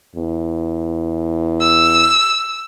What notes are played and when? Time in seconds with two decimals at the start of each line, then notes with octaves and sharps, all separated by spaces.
0.15 E2
1.60 E6